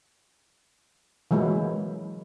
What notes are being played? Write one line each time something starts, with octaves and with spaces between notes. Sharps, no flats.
E3 F#3 G#3 A#3 E4